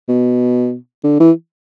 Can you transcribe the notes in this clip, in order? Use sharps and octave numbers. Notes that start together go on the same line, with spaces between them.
B2
D3
E3